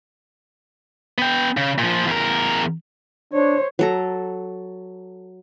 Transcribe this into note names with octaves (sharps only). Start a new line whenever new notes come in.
B3 G5
C#3
A#2 F3
E2 A#4
D4 C5 C#5
F#3 A4 A#5